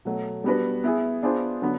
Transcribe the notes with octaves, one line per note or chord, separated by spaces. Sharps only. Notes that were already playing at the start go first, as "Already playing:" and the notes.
B2 F#3 A3
G3 B3 D4 F#4 B4
B3 E4 G#4
B3 D4 F4 G#4 C5
D3 F#3 B3